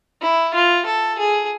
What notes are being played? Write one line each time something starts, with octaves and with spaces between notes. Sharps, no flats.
E4
F4
A4
G#4